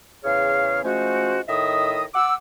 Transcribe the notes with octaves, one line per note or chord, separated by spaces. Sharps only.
E2 C#3 G#4 C#5 F5 F6
F3 G#3 A3 C#4 F#4 C5
A2 D#3 D#5 E5 D#6
F#5 D6 E6